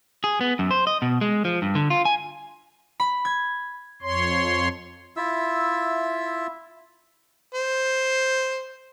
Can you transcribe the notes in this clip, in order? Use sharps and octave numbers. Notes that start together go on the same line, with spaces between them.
G#4
B3
F#2
C5
D#5
B2
G#3
F3
G2
D3
F4
G#5
B5
G#6
F2 C#5 C6
E4 F4 E5 E6
C5